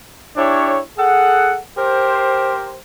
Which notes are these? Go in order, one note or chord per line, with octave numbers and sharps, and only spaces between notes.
D4 E4 G4 C#5
G#4 A4 F#5
G4 A#4 C5